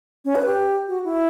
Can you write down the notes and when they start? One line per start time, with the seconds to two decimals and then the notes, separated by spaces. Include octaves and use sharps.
0.25 C#4
0.35 B4
0.46 G4
0.88 F#4
1.04 E4